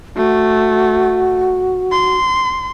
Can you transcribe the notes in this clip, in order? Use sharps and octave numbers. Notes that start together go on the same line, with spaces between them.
A3 F#4
C6